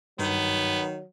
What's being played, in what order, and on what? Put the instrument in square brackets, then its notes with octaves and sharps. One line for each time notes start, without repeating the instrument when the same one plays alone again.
[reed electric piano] G2 [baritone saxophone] D#3 [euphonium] F#3 [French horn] B3